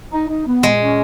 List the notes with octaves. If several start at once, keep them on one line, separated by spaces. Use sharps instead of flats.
D#4
D#4
B3
A#2 G#3
C#4